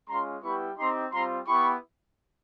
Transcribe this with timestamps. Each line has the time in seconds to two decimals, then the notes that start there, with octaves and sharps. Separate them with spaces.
0.08 G#3 C#4 F4 A#5 C6
0.44 G3 B3 E4 G4 B5 C#6
0.78 C4 D#4 G4 A#5 C6
1.13 G3 C4 F4 A#5 C6
1.48 B3 E4 G4 B5 C#6